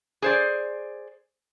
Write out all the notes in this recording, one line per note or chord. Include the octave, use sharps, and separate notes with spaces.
G#4 C5 D5